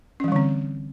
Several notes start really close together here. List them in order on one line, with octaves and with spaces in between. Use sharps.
C#4 E3 G3 D3 C4